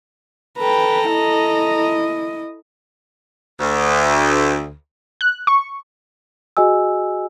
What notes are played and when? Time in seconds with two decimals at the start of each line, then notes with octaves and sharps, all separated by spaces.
0.58 A4 B4 G5 A#5
1.10 E4 D#5
3.59 D2
5.21 F#6
5.47 C#6
6.57 F#4 G#4 D#5 G#5 E6